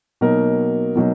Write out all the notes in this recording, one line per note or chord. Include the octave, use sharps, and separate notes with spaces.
B2 F#3 A#3 D#4 A#4
B2 F#3 A#3 D#4